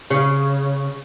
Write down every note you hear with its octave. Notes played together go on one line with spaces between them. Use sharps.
C#3